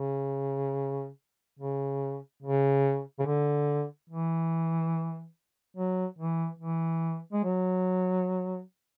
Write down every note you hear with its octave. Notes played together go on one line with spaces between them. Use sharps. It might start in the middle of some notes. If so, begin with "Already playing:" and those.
Already playing: C#3
C#3
C#3
C#3
D3
E3
F#3
E3
E3
G#3
F#3